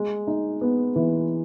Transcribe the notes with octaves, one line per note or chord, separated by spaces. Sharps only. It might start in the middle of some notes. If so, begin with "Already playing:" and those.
Already playing: G#3
D#4
B3
E3